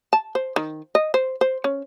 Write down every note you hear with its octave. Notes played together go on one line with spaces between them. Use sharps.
A5
C5
D#3
D#5
C5
C5
C#4